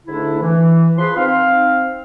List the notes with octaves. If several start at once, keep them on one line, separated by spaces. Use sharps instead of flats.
G#2 D3 A3 D4 E4
E3
F3 G#4 B4 C6
C4 D#4 F5